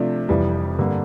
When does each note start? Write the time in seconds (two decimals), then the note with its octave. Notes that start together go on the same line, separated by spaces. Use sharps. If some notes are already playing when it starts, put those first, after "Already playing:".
Already playing: C3 F3 A3 D4 F4
0.29 F1 F2 E3 G3
0.78 G2 D3 G3 A#3